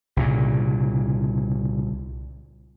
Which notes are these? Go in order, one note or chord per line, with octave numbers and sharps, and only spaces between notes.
C2 A#2 C#3